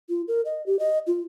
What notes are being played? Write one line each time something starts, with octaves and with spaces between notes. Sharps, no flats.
F4
A#4
D#5
G4
D#5
F4